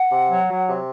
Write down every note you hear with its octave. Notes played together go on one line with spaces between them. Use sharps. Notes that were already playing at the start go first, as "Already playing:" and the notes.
Already playing: F#5
C3
F#3
F#3
C3